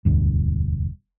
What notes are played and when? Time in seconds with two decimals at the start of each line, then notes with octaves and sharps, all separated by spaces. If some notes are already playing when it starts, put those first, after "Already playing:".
0.05 E1 D2 G2